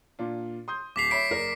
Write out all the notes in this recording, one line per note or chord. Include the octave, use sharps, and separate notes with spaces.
A#2 D4 F4
C6 D#6 G6
D1 D6 B6 C7 F7
C#5 E5 B5 B6 D7
F#1 A#4 D5